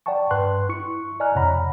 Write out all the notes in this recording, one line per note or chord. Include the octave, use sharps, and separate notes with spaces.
D5 F#5 G5 A5 C#6
G2 B4 C6 F#6
E4 C#6 C#7
D5 D#5 G#5 A#5 F6 F#6
F2 C3 C#5 F#5 A#5 B5